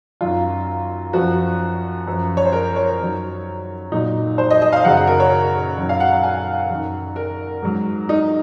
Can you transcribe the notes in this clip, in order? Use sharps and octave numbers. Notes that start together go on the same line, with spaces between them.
F#2 D#3 F#3 F4
F#2 F3 F#4
F#2 F3
C#5
C5
A#4
C#5
F#2 D#3 F#3
A#2 F#3 D#4
C5
D#5
D#5
F5
F#2 C#3 F#3 F#5
F#5
A#4
C#5
F#2 D#3 F#3
F5
F#5
F5
G#5
F#2 D#3 F#3
A#4
G#2 F#3
D#4